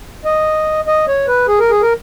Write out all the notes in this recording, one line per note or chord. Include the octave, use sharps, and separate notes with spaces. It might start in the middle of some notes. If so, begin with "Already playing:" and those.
D#5
D#5
C#5
B4
G#4
A#4
G#4
A#4